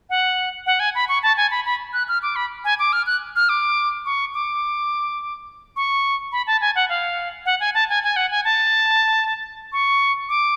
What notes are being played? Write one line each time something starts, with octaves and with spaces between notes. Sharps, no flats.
F#5
F#5
G#5
B5
C#6
A5
G#5
B5
B5
F#6
F6
D6
B5
G#5
D6
F6
F#6
F6
D6
C#6
D6
C#6
B5
A5
G#5
F#5
F5
F#5
G#5
A5
G#5
G#5
F#5
G#5
A5
C#6
D6